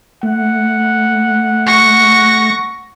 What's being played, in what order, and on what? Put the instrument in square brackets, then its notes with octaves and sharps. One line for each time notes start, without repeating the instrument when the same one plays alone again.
[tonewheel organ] A3 [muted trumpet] F#5
[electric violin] C#6 A#6